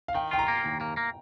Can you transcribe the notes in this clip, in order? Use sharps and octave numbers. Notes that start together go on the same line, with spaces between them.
F5
D#3 G5
F4 G5
A#5
A#3
D#2
A#3
A#3